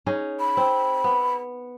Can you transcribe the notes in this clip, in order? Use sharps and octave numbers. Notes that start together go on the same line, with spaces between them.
C#4 D#4 G#4
B5
C4
B3